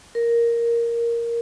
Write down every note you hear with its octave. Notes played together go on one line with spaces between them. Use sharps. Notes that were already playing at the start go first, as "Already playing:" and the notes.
A#4